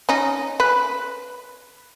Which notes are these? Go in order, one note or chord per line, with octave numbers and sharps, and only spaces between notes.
C#4 D#4
B4